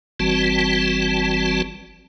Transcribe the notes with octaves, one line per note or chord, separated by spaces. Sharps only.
G1 E3 G3 C4 F#4 A5